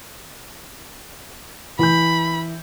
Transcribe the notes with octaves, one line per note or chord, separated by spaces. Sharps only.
E3 B5 G6